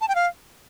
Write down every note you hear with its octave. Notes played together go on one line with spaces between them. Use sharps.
A5
G5
F5